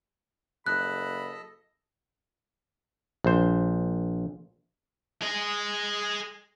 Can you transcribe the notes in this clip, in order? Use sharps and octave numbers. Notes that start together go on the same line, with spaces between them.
F#1 A4 D#5 A5 B5 F#6
A#1 C5
G#4 D#5